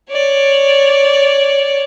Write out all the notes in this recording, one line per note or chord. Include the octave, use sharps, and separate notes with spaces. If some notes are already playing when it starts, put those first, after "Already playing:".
C#5 D5